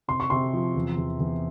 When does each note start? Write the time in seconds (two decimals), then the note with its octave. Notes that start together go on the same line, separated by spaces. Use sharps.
0.08 C3 C6
0.20 C#6
0.30 C3 C6
0.53 F3
0.76 E2
0.98 E2
1.20 E2